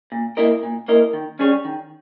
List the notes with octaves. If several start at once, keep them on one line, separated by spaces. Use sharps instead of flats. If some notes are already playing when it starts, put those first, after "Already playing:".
A#2
A#3 E4 A#4 D#5
A#2
A#3 E4 A#4 D#5
D#3
G3 C#4 G#4 C#5
D#3